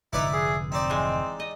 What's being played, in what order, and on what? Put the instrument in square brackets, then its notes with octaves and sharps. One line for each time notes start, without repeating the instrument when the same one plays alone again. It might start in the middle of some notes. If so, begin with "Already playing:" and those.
[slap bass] F1 G#2 D3 [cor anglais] D#4 [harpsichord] E4 B4 D5
[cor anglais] G#4
[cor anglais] C4 [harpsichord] D#4 D5
[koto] E3 G#3
D#5